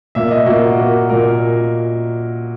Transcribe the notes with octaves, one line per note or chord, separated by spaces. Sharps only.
A#2 A#3 E5
D#5
A#2 A#3 F#4
A#2 A#3
A#2 A#3 A#4